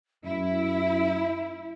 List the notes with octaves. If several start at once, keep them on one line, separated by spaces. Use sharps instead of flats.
F#2 E4 E5